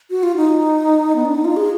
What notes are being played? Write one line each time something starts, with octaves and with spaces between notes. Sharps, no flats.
F#4
F4
D#4
B3
D4
D#4
F4
G#4